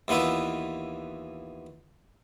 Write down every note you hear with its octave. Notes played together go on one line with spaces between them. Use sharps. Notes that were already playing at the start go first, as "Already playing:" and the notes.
D#2 E3 B3 F4 E5